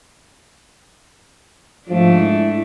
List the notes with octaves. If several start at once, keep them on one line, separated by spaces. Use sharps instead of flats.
G#2 F3 A3 D4
E4